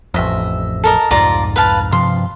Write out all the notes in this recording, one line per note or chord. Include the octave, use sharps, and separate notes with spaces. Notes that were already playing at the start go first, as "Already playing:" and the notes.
A1 F2 D#5 E5
A4 A#4 D#5
C2 F2 G#2 F4 D5 A#5
B4 F5 A5
G2 C3 F3 C6